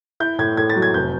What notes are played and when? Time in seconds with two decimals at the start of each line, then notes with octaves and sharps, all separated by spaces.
0.20 E4 G6
0.39 A2 G#6
0.57 A2 G#6
0.70 A6
0.76 F#3
0.82 G#6
0.94 F1 G6